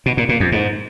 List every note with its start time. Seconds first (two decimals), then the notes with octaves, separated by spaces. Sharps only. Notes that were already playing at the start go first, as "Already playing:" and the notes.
0.06 B2
0.17 A#2
0.29 A#2
0.40 F2
0.52 G#2